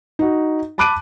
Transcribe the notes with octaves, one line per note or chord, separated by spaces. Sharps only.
D#4 F#4
A5 B5 D6 F#6 D7 D#7